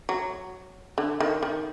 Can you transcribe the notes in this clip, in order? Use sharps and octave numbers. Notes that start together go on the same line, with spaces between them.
F#3
D3
D#3
D#3